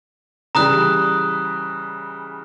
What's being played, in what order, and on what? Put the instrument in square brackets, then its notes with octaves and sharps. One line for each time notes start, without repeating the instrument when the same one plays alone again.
[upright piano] C#3 E3 G3 [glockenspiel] A#5 D#6 F#6